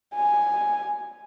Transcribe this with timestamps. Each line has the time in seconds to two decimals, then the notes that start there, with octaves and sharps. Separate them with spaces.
0.15 G#5